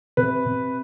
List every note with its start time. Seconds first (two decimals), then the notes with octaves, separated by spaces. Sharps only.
0.17 C3 B4
0.45 C3